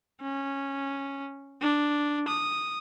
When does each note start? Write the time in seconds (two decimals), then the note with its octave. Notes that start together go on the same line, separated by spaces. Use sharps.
0.21 C#4
1.62 D4
2.28 D#6